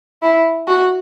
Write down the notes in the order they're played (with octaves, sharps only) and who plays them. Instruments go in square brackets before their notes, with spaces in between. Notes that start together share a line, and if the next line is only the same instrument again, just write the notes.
[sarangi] E4
F#4